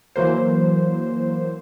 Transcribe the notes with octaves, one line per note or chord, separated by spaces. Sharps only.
E3 F#3 A#3 C5